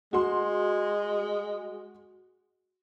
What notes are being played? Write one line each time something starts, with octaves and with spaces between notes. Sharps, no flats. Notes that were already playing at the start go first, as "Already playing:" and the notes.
G#3 F#4 C6